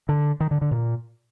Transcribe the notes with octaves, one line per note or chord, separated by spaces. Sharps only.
D3
D#3
D3
D3
A#2